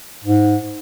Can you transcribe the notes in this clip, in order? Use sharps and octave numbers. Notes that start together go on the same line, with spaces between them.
G#2